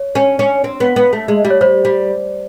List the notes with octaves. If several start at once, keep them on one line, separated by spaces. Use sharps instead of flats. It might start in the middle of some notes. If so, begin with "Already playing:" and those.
Already playing: C#5
C#4
C#4
C4
B3
B3
A3
G#3
G3
C#5
G3 C5
G3